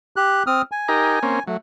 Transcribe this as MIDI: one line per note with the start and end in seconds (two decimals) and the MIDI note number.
0.16 0.43 67
0.16 0.43 90
0.47 0.62 60
0.47 0.62 87
0.47 0.62 89
0.72 1.43 80
0.88 1.19 63
0.88 1.19 67
0.88 1.19 70
1.23 1.40 58
1.23 1.40 60
1.23 1.40 61
1.47 1.57 54
1.47 1.56 57